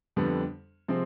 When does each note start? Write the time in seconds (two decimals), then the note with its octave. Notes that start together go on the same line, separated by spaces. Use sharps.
0.16 F2 D3 G3 B3
0.88 C3 F3 G#3 C4